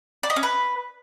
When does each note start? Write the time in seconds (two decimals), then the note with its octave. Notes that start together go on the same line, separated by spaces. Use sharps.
0.23 D5
0.30 D#5
0.36 C#4
0.43 B4